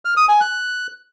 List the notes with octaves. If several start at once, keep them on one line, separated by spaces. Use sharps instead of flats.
F6
D#6
G#5
F#6